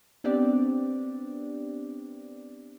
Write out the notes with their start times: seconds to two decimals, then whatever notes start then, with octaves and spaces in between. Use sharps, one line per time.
0.24 B3 C4 D4 G4 D5